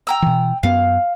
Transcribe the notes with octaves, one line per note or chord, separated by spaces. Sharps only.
G5 A#5 E6
B2 E3
F#2 B3 F5